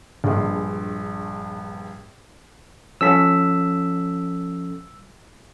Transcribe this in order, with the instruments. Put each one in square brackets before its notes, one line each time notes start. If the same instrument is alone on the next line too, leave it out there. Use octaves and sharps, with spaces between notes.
[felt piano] A#1 G2 G#3
[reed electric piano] F3 C#4 A4 [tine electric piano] E6 B6